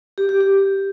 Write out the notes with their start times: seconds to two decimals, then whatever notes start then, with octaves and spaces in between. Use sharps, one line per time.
0.18 G4
0.29 G4
0.40 G4